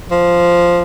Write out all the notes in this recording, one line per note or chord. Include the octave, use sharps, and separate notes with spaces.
F3